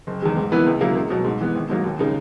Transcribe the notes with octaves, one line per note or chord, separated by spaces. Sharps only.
F#1
E2 D#3 G#3
G#2
E3 B3 E4 B4
C#2
C#3 F#3 A#3 E4
C#2
B2 F#3
G#2
E3 B3
G#1
G#2 F#3 A#3
D#2
C#3 G#3 D#4